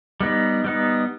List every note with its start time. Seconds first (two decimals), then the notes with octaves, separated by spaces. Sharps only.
0.20 G3 B3 D#4
0.64 G3 B3 D#4